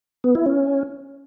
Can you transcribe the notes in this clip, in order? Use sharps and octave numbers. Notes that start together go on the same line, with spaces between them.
B3
E4
C#4